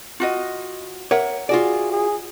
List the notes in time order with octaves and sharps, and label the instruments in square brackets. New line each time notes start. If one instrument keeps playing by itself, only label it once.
[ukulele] F4 F#4 D#5
[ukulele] A#4 E5 F#5 [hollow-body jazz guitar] C#5
[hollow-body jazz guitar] F4 F#4 D5 [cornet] G#4
[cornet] G#4